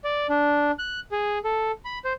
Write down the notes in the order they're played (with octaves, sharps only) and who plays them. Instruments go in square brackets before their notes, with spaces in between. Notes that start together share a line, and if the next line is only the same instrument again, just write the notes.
[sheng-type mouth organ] D5
D4
F#6
G#4
A4
B5
C5